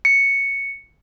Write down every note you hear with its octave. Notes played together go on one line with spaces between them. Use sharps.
C#7